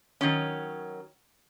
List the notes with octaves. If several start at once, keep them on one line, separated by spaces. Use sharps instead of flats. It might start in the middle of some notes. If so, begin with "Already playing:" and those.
D#3 F#3 C#4